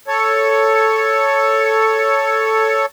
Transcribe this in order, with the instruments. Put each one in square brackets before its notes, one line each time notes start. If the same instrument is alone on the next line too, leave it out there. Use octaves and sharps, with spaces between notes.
[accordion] A4 C#5